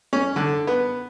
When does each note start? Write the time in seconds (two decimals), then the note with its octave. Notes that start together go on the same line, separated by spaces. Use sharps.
0.13 C#4
0.36 D3
0.67 B3